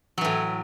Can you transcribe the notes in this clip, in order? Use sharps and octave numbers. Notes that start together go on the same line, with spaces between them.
A2 E3 F#3